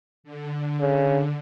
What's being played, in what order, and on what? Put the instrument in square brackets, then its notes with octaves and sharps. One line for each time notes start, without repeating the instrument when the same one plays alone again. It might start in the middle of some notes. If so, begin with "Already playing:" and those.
[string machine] D3
[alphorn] C#3